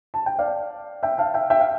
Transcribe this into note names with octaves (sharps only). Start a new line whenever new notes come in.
A5
G5
D5 F5
E5 G5
F5 A5
E5 G5
E5 G5
F5